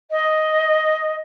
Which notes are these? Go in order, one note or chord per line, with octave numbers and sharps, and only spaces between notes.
D#5